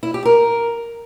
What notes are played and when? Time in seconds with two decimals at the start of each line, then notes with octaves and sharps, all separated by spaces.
0.03 E4
0.14 G4
0.25 A#4